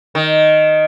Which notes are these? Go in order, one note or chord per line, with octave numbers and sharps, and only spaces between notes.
D#3